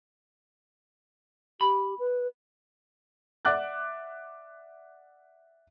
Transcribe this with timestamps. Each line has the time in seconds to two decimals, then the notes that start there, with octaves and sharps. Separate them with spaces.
1.61 G4 B5
1.99 B4
3.45 D5 E5 F#5 D6 F#6 A6